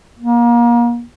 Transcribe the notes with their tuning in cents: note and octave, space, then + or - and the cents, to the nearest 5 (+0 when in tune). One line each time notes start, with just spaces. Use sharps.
A#3 +30